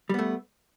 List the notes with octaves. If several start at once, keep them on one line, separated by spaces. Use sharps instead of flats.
G3 A3 B3